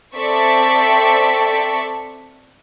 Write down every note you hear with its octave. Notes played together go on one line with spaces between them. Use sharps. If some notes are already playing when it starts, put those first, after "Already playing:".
C4 A4 D5 E5 C#6 B6